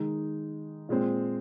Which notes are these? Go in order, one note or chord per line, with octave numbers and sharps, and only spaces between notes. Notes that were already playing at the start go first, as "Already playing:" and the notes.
Already playing: D#3 G#3 D#4
A#2 G#3 C4